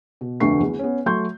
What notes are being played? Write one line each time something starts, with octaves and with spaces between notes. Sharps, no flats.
B2
F1 D2 G2 A3 C#6 C7
E2
B3 C#4
F#3 A3 C6 C#6 G6